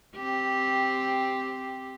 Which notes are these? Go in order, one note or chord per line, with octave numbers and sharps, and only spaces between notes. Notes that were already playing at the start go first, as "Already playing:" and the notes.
C4 G4